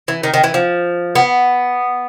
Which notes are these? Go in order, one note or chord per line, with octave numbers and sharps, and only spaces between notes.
E3
D#3
D#3
E3
F3
B3